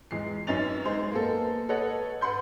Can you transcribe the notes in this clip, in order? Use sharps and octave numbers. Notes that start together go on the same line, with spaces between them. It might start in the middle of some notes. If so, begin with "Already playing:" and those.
E2 G#3 C7
F#2 B3 C#4 D#4 A6 F7
G#3 D#4 G#4 C5
A#3 B3 A4
A4 B4 C#5 D#5 F#5
B4 F#5 B5 C6 G6